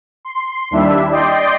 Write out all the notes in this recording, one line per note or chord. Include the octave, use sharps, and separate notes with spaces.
C6
D#2 G3 D4 E4 E5
D5 D#5 G5 C6